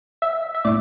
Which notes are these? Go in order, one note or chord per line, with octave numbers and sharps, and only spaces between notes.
E5
E5
A2 D5